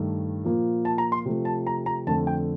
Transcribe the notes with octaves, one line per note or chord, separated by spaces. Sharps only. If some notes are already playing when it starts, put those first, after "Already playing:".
Already playing: G2 D#3 A3
A#2 F3 A#3
A5
A#5
C6
C3 F3 A3
A5
A#5
A#5
F2 D3 A3 A5
G5